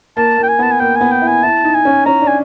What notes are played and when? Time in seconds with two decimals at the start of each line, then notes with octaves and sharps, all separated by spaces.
0.17 A#3 A5
0.38 A#3
0.43 G5
0.49 G#5
0.59 B3 A5
0.71 G#5
0.80 A#3 G5
0.96 B3 G#5
1.12 G5
1.22 E4
1.28 G#5
1.43 E4 A5
1.64 D#4
1.75 G#5
1.85 C#4
2.06 C#4 A#5
2.22 D4
2.27 G#5